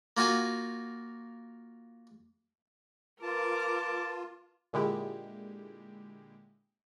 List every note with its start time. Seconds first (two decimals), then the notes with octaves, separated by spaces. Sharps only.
0.17 A#3 F4 F#4 G#5
3.22 F4 A#4 B4 A5 D6
4.73 A#2 D3 G#3 E4 G4